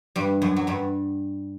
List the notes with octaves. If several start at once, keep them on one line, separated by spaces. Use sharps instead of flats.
G2 G3
F#2 F#3
F#3
G2 G3